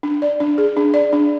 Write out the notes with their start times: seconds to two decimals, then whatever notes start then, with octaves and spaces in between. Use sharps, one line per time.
0.03 D4
0.22 D5
0.40 D4
0.58 G#4
0.77 D4
0.94 D5
1.13 D4